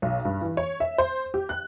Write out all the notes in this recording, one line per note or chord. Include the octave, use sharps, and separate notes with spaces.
B1
G2
E3
C#5
E5
C5
G4
F#6